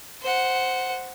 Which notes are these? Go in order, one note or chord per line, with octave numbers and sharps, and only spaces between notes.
C5 F#5